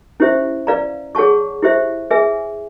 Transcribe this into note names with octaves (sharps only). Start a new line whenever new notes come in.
C#4 E4 G4 C5 E5
B4 D5 F5 A#5
G#4 C#5 F#5 A5 C#6
E4 G4 C5 E5
G#4 B4 E5 G#5